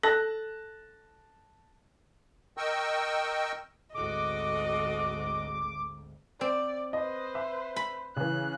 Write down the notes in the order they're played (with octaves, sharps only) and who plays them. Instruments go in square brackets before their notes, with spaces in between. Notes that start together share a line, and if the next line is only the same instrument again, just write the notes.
[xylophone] A4 [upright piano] A5 F#6 A#6
[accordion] A#4 D#5 G5 C#6 E6
[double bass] G#1 D2 [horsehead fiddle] F#4 A4 [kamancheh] D#5 [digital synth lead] D6
[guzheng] C4 [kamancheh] D5
[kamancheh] B4 C5 [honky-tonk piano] D#5
[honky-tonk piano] E5
[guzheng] B5
[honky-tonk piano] C#3 E3 [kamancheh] F#6